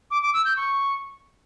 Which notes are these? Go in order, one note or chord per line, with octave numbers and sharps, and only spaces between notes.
D6
D6
E6
G6
C#6